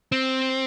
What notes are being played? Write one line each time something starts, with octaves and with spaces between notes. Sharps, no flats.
C4